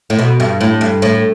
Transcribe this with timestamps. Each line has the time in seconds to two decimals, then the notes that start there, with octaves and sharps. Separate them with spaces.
0.10 A2
0.19 B2
0.40 G2
0.61 A2
0.81 G2
1.02 A2